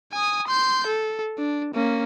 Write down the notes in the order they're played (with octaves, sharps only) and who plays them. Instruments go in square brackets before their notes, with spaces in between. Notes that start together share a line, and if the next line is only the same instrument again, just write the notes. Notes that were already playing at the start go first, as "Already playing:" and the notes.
[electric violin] G#5 D#6
C6 G6
A4
D4
A#3 C#4